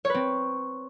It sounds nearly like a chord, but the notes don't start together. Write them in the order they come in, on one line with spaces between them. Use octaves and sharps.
C#5 B4 C4